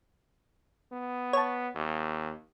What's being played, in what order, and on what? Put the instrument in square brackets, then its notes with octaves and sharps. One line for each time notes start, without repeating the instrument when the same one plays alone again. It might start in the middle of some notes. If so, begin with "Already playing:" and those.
[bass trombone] B3
[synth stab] C#5 A5
[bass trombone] D#2